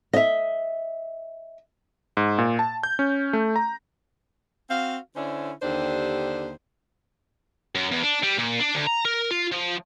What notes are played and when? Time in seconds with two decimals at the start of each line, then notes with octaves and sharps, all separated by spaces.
0.13 D#5 E5
2.17 G#2
2.38 A#2
2.59 A5
2.83 G6
2.99 C#4
3.33 A3
3.56 A#5
4.70 C4 F#4 F5
5.16 D3 C#4 D4 E4 C5
5.63 D#2 D3 D4 G4 C5
7.75 F#2
7.92 E2
8.03 D4
8.24 G3
8.39 A#2
8.60 D4
8.75 D2
8.87 A#5
9.05 A#4
9.31 F4
9.52 F3